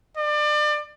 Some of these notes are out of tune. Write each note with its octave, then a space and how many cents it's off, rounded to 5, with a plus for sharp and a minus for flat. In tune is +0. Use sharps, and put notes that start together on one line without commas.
D5 +30